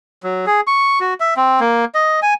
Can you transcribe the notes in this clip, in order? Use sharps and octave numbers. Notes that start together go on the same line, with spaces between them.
F#3
G#4
C#6
F#4
E5
C4
A#3
D#5
G#5